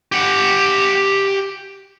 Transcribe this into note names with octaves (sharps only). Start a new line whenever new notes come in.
G4 F#5